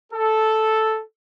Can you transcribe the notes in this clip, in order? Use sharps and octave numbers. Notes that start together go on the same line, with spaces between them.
A4